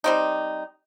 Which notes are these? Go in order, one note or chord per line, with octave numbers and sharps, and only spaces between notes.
G3 C4 D#4